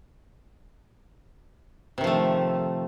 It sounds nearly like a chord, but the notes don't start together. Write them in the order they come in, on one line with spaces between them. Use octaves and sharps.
C3 D#3 F3 A3